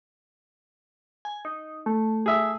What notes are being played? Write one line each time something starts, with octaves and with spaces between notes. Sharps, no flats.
G#5
D#4
A3
G#4 E5